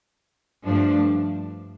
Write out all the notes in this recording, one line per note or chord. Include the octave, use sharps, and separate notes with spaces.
G2 F3 A3 D4